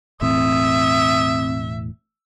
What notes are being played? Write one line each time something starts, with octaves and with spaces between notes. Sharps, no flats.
E1 A2 E3 C4 E5 D#6